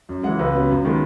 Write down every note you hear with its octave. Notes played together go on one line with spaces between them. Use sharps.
F#2
E3 G#3 F#5
C#2 B4
C#3 F#3 B3
F#2
D#3 G#3 B3